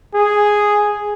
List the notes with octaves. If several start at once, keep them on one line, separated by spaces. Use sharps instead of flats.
G#4